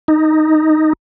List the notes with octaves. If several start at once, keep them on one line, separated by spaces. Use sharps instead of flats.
D#4